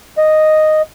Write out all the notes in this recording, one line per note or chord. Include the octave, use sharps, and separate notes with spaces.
D#5